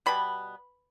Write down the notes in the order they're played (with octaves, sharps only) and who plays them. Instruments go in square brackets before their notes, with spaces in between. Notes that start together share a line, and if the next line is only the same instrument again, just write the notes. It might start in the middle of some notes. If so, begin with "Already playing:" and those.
[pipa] B2 G3 B3 B5